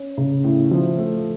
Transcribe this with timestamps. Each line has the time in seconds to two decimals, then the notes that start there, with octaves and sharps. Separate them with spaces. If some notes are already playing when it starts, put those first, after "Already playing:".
Already playing: C#4
0.18 C#3
0.44 A2
0.71 F3
0.98 A3